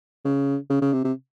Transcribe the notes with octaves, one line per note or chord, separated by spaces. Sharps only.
C#3
C#3
C#3
C3
C3